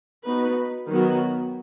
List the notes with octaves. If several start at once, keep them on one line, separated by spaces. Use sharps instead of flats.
B3 D#4 F#4 B4
D#3 F#3 B3 F#4